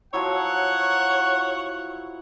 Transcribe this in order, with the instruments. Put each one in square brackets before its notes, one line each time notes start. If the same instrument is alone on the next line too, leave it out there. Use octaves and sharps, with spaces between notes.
[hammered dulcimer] F3 F#3 E4 [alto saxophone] C#5 [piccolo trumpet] F#5